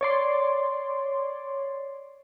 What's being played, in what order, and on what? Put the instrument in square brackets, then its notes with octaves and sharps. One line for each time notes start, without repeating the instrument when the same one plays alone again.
[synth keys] C#5 D5 C6